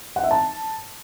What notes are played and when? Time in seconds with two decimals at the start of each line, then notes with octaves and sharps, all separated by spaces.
0.16 F#5
0.23 E5
0.31 A5